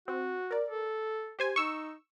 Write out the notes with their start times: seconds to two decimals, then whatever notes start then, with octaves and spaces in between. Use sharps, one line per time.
0.08 C4 F#4
0.51 A#4 D5
0.69 A4
1.39 G4 C5 G#5
1.56 D#4 C#6 E6